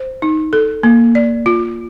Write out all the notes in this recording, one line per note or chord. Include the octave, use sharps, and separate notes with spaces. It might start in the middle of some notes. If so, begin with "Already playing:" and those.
Already playing: C5
D#4
A4
A#3
D5
F4